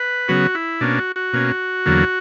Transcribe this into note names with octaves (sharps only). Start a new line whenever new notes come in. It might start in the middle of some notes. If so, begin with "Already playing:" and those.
Already playing: B4
C#3 F#3 B3 F#4
E4
B2 A#3 C#4 D4
F#4
F#4
B2 A#3 C#4
E2 D3 F#3 A#3